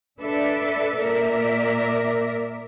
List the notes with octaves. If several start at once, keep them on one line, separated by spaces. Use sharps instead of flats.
D4 A4 B4 D5 E5
A#2 A#4 D5 E5